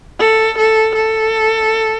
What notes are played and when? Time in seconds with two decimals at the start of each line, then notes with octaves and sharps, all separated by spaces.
0.20 A4
0.58 A4
0.96 A4